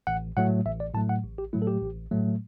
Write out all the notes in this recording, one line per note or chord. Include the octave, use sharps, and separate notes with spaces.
A1 F#5
A2 F#3 A3 F#5
A1 E5
D5
A2 F#3 A3 A5
F#5
A1
G4
A2 F#3 A3 E4
A4
G4
A1
A2 F#3 A3